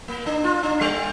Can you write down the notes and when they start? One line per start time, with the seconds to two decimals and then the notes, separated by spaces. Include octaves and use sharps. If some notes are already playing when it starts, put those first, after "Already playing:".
0.08 A#3
0.26 D4
0.44 F4
0.63 D4
0.81 G3